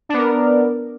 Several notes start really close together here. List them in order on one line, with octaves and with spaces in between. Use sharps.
D4 B3 A#4